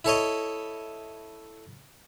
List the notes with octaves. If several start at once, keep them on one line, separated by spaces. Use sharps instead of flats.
E4 A4 C#5 D#5